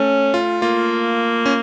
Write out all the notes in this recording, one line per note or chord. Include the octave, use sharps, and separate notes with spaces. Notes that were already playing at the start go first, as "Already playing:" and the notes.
Already playing: A3 C#4
F4
A#3 F4
C#4